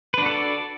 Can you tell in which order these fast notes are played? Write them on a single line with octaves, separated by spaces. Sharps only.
B4 D4 F#4 A4 D5